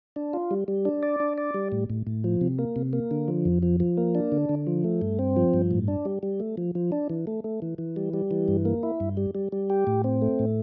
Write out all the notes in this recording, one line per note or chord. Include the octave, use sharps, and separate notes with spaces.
D4
F4
G3
G3
D4
D5
D4
D5
G3
A2
A2
A2
F3
C3
A#3
C3
A#3
D3
F3
F2
F3
F3
A#3
D4
D3
D3
F3
A3
G2
C4
F3
G2
A2
D4
G3
G3
A3
F3
F3
D4
E3
A3
A3
E3
E3
G3
G3
E3
G2
A#3
E4
G2
G3
G3
G3
G4
A2
C4
A3
A2